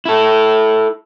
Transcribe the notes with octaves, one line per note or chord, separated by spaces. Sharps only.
E4 A4